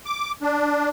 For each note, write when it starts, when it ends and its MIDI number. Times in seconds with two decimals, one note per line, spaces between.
0.06 0.32 86
0.42 0.89 62